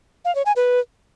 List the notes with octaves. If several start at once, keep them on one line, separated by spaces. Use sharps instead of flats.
F5
C#5
G#5
B4